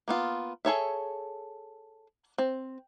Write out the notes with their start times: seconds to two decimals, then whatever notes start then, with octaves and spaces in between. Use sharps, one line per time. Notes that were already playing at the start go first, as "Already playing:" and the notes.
0.08 A#3 B3 F4
0.65 G#4 A4 C#5 E5
2.38 C4